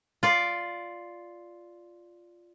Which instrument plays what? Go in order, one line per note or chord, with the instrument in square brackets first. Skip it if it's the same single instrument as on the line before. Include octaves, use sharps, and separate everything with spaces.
[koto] F4 D5